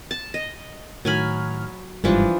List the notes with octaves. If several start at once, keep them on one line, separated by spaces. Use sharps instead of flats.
A5
D#5
A2 D#3 F#3 G#5 B5 F6
G1 G#2 E3 F3 G3 D4